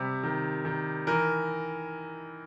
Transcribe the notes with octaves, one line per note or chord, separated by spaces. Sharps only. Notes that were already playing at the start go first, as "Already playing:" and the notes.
Already playing: C3 G3
D#3
D#3
E3 A#4